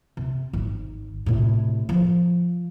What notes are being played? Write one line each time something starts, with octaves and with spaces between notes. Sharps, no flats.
C3
G#1
A2 C3
F3